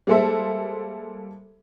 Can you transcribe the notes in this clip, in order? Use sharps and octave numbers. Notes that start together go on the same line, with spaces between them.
G3 G#3 A#3 A4 C5 E5